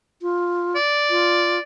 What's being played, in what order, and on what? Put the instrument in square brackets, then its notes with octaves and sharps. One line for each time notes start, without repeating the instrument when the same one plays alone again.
[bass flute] F4
[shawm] D5
[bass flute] F4